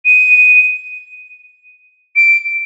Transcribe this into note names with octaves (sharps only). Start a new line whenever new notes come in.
D#7
D7